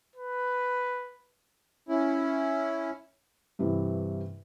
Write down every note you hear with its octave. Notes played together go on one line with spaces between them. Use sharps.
B4
C#4 E4
G2 C3 E3 E4